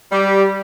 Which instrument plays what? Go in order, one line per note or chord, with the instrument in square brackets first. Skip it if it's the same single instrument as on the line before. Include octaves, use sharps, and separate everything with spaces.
[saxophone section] G3